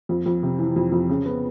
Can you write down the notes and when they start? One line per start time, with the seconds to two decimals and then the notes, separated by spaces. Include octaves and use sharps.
0.09 F2
0.26 F2
0.43 C3
0.59 E3
0.76 F2
0.92 F2
1.10 C#3
1.26 B3